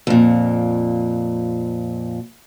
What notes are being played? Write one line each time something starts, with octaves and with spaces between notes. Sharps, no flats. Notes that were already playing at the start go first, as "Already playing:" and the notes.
F2 A#2